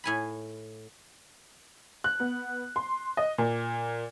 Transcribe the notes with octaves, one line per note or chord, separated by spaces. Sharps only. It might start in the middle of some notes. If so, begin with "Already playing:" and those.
A2 G#5 B5
F#6
B3
C6
D#5
A#2